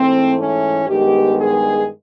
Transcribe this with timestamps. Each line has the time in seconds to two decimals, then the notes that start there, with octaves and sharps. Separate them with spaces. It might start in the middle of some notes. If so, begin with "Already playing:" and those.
Already playing: G#2 E3 A3 C4
0.38 C#4
0.87 G2 D#3 G#3 B3 G4
1.37 G#4